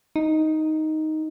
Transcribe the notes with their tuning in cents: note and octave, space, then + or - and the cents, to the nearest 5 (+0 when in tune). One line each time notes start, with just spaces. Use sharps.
D#4 +5